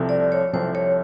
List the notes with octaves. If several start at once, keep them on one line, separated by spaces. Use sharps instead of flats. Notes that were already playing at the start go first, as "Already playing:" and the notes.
Already playing: C2 C3 F3 A3
D5
C#5
C2 C3 F3 A3 C5
C#5